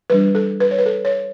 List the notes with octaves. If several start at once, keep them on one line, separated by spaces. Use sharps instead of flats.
E3 G3 D4 B4
A4
B4
C#5
B4
A4
C#5